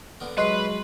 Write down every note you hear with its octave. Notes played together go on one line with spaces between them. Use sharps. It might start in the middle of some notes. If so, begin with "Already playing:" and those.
D3 B3 A#4
F#3 G#3 F#4 B4 D#5 C6 C7